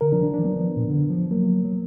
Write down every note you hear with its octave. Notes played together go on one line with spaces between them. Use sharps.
D3 A#4
F3 D4
D#3 D4
F3 D4
F#3 B3
F3
A#2
D3
F3
F#3 A#3
F#3